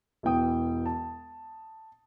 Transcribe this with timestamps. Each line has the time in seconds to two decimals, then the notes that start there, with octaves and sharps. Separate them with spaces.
0.23 E1 E2 E3 G5 D#6
0.86 A5